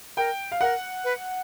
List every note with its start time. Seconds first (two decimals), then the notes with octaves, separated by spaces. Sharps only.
0.17 A#4 G5
0.52 F5
0.61 A#4 F#5
1.04 B4